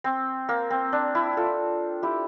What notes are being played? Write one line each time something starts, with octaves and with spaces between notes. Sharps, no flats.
C4
A#3
C4
D4
E4
F4 A4
E4 G4